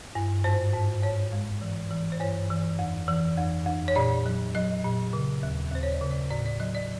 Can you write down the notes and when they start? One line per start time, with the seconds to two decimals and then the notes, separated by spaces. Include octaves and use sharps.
0.15 G2
0.44 G#2 C5
0.74 G#2
1.02 G#2 C#5
1.32 G#3
1.62 E3
1.91 E3
2.12 C5
2.20 G2 C#5
2.50 E3
2.79 F2
3.08 E3
3.38 F2
3.67 F2
3.88 C#5
3.96 A#2 D5
4.26 F#3
4.55 F#3 D#5
4.84 A#2
5.13 C#3
5.43 D#2
5.72 D#2 C5
5.83 C#5
5.92 D5
6.01 C#3
6.11 D5
6.30 A2 D5
6.46 D5
6.60 F#3 D#5
6.75 D5